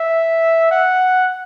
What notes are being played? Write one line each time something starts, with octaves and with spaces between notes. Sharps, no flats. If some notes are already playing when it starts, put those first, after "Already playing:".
Already playing: E5
F#5